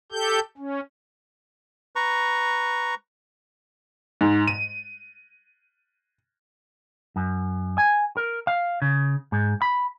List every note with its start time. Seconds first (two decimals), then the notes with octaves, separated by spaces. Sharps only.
0.12 G4 A4 G6
0.58 C#4
1.96 B4 A#5 C#6
4.21 G#2
4.47 D#7
7.16 F#2
7.78 G#5
8.17 A#4
8.47 F5
8.82 C#3
9.32 G#2
9.62 B5